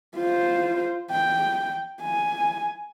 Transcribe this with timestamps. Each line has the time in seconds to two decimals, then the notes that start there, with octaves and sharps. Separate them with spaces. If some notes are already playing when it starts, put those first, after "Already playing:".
0.17 F4 C5
1.11 G5
2.03 G#5